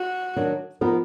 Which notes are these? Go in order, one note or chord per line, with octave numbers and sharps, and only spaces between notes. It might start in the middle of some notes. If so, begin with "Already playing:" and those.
Already playing: F#4
D#3 F#3 D4
F3 B3 D#4 A#4